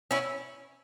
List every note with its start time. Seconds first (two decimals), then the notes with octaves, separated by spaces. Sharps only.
0.11 C#4 E4